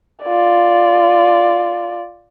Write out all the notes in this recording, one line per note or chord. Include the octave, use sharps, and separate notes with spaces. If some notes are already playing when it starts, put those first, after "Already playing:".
F4 D5